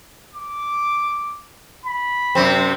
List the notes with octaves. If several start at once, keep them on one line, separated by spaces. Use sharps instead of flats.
D6
B5
F#2 C3 C4